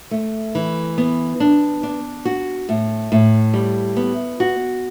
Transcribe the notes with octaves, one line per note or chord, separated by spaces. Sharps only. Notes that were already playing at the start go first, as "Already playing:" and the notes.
A3
E3
B3
D4
D4
F#4
A2
A2
G3
B3
F#4